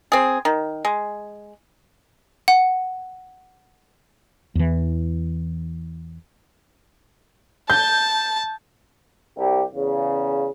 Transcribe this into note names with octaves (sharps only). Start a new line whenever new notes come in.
C4 G#4
D#3
G#3
F#5
E2 E3
A5 G6
C2 G4
E2 C#3